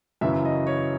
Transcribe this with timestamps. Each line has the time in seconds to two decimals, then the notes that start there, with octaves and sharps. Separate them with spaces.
0.21 F#2 C#3 E3 E5
0.45 D#5
0.67 C#5